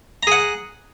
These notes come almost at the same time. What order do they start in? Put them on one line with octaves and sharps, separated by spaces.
A#5 G#4 F#5